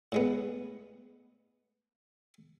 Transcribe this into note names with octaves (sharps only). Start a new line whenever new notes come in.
A2 G#3 B3